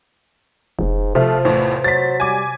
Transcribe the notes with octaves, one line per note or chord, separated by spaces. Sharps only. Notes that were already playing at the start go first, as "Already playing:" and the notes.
F1 G#2
C3 F3 A3 F4 C5
E2 A2 F3
F#3 A6 B6
G3 G#5 D6